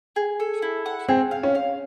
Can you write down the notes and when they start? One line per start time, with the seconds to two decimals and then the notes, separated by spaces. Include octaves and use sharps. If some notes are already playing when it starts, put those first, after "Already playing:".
0.16 G#4
0.40 A4
0.62 E4
0.86 F#5
1.08 C4 G#4
1.31 F5
1.43 C#4
1.55 F5